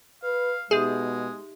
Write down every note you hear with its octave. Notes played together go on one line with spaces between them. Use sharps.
B4 F5
B2 G#3 D#4 G4 G#4 E5